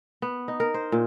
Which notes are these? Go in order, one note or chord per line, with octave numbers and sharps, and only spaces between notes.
B3
D#4
A#4
C5
A#2